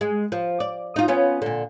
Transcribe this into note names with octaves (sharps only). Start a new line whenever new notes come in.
G#3
F3
D5
D#4 F4
B3 C#4 F4
A#2 D3